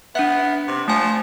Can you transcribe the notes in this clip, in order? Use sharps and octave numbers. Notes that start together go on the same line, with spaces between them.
B3 D4 E5
C3
F3 A3 G#5